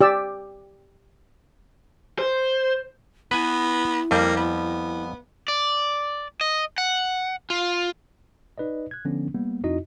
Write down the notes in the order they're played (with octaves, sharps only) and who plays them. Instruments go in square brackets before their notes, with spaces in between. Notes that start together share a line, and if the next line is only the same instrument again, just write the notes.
[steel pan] G4 D5 E6
[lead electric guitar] C5
[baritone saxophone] B3 [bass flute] E4 [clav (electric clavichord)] B4 G#5
[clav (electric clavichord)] F2 G3 [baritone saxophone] A#3
[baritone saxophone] B3
[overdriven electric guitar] D5
D#5
F#5
F4
[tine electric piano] D#4 B4 D5 D#5
F#6 G#6
D3 F3 B3 C#4 D4
G3 A#3 B3
F2 D#4 E4 F#4 D#5